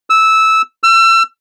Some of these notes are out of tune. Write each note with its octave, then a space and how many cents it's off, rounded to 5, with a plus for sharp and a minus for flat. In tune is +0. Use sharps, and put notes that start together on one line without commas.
E6 -10
E6 +35